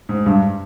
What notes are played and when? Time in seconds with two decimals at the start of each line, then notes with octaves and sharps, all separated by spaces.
0.09 G#2
0.26 G2